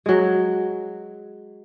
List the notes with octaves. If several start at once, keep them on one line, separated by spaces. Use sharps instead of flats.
F#3 G#3